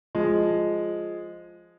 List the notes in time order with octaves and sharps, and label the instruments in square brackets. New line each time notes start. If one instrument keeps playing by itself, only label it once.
[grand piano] F3 G#3